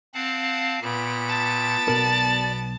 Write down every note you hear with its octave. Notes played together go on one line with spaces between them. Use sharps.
C4 F5 F#5 A5
A#2 B3 D7
A5
B1 B2 A#4 D5